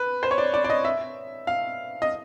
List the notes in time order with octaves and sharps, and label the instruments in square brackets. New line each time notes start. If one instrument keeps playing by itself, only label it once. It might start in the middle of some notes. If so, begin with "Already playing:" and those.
Already playing: [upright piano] B4
C5
C#5
D5
D5
D5
D#5
E5
F5
D#5